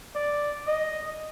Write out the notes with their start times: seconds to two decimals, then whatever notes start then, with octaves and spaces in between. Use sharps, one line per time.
0.15 D5
0.67 D#5